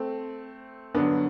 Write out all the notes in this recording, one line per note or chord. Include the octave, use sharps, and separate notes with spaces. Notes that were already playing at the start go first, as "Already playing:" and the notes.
Already playing: A3 C4
G2 D3 F#3 B3 D4